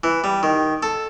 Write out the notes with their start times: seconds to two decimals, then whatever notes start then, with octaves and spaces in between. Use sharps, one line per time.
0.04 E3
0.24 G3
0.43 D#3
0.83 A4